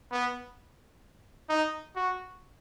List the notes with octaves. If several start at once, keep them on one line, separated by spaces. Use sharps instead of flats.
B3
D#4
F#4